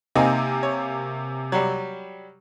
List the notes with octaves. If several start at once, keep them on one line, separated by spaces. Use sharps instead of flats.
C3 A#3 C4 D#4 G#5
C#5
F#3 G3